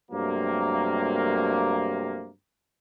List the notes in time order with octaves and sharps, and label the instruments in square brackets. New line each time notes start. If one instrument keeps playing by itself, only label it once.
[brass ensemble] G2 C3 F#3 A3 A#3